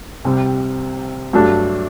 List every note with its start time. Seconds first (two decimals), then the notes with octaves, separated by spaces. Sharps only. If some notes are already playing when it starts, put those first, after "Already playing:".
0.24 C2 C3 G3 C4
1.33 G2 F#3 A3 D4 F#4